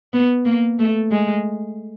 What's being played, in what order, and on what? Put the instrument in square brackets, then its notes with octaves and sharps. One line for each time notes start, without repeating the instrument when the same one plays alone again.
[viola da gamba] B3
A#3
A3
G#3